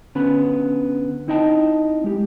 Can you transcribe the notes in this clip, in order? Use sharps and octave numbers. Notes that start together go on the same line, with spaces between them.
D3 B3 C#4 B4 B5
C4 D#4 E4 D#5 G5 A5
G#3 G4